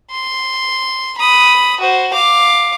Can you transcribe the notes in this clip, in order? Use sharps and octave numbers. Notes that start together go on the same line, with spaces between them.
C6
B5 D#6
F#4 C5
F5 D6